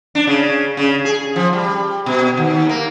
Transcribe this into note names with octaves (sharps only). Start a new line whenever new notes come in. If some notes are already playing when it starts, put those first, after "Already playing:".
D4
C#3
C#3
G#4
F3
G3
B2
D#2
A#3